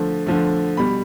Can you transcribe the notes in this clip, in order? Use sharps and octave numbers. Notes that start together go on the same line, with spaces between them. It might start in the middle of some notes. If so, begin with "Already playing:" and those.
Already playing: D3 F3 A3
D3 F3 A3
B2 G3 B5